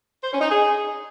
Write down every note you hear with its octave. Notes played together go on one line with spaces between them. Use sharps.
C5
C#4
D#4
G#4